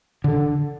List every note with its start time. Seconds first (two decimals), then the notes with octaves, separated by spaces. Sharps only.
0.24 D3